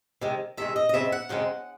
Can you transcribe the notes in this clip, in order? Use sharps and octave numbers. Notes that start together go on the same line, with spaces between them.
C3 D#3 G#3
C3 D#3 G#3 E5
D#5
D#5
F#2 C#3 G#3 C4 E5
F#5
F#2 C#3 G#3 C4